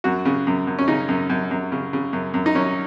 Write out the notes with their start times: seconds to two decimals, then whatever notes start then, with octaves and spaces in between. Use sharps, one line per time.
0.04 F#2 F#4
0.25 C#3
0.47 F#2
0.67 F#2
0.79 C#4
0.88 C#3 D#4
1.09 F#2
1.30 F#2
1.51 F#2
1.72 C#3
1.93 C#3
2.13 F#2
2.34 F#2
2.46 D#4
2.55 F#2 C#4